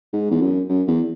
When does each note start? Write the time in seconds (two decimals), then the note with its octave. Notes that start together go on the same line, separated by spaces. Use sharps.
0.13 G#2
0.31 E2
0.41 F#2
0.69 F#2
0.88 E2